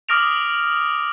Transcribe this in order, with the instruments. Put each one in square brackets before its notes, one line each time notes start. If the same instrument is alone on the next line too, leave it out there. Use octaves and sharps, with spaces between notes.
[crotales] D6 D#6 F6 A#6 D7 F7